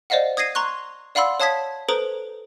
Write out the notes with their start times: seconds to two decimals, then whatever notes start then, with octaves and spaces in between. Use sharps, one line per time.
0.10 C5 D5 D#5 F5 F#5
0.37 D#6 G#6 A#6 C7 D#7
0.55 A#5 C6 C#6 F#6
1.15 D5 F5 F#5 B5 C6 E6
1.40 C#5 F5 A5 D#6 G#6 B6
1.89 A4 B4 C5 A#5 D#6 D7